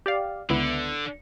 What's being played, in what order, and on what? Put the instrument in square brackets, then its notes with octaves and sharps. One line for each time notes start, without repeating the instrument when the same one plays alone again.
[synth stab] G4 D5 F5
[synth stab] C#2 B3 E4 [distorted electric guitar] D3